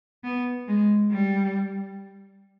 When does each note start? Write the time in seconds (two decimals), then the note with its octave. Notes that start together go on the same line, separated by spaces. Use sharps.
0.24 B3
0.68 G#3
1.12 G3